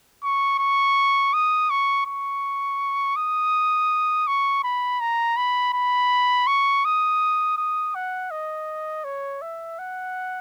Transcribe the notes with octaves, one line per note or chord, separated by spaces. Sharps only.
C#6
C#6
D#6
C#6
C#6
D#6
C#6
B5
A#5
B5
B5
C#6
D#6
D#6
F#5
D#5
C#5
E5
F#5